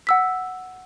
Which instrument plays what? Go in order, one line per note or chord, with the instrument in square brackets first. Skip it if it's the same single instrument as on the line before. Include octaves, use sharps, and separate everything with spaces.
[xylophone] F#5 E6 B6